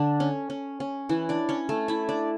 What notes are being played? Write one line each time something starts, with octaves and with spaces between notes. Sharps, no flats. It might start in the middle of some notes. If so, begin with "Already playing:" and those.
Already playing: D3 D4
C#4
C#4
C#4
E3 E4
D4 D5
C#4 C#5
A3 A4
E4 E5
D4 D5